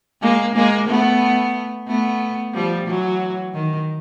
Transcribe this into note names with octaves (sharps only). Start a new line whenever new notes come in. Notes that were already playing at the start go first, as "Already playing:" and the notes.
G#3 A#3
G#3 A#3
A3 B3
A3 B3
F3 G3
E3 F#3
D#3